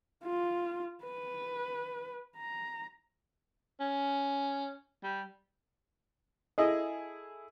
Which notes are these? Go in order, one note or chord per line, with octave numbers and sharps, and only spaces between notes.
F4
B4
A#5
C#4
G3
E4 G#4 A4 D#5